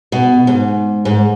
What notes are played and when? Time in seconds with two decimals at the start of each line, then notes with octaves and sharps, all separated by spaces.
0.12 B2
0.47 G#2
1.05 G#2